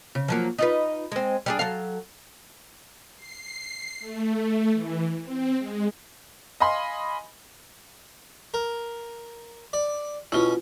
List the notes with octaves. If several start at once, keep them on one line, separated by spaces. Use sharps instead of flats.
C#3
F3 F#3 A#3
D#4 F4 B4
G#3 C4
G3 D4 G#4
F#3 A4 F5
C7
A3
E3
C4
G#3
D#5 F5 G#5 B5 C6
A#4
D5
B2 C#4 E4 F4